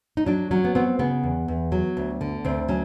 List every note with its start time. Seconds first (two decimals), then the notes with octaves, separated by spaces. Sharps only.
0.17 D#4
0.26 F#3 D4
0.51 F#3 C#4
0.65 B3
0.75 B3 C4
0.99 C#3 B3
1.24 E2
1.48 E2
1.72 F#3
1.97 D2
2.21 D3
2.45 D2 C4
2.69 F#3 C#4